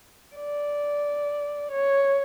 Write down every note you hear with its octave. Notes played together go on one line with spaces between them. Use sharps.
D5
C#5